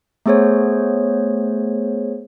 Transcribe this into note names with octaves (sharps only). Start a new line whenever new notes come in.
A3 B3 G#4 C5 C#5